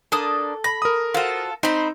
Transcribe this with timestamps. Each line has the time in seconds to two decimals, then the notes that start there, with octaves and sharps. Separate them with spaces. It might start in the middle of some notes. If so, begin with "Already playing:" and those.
0.12 A#3 D4 A4 D#6
0.64 B5 A#6
0.82 A#4 D#6
1.14 F4 F#4 A4 C5 F5
1.63 C4 D#4 C5 B5